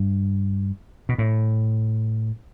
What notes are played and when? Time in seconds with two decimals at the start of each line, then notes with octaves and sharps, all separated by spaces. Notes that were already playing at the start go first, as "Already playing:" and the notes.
Already playing: G2
1.09 B2
1.18 A2